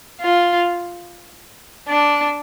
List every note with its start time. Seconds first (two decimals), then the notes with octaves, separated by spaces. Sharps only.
0.21 F4
1.88 D4